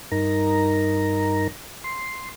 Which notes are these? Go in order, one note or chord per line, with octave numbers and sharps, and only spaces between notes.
G2 D#4 A#4 A#5
C6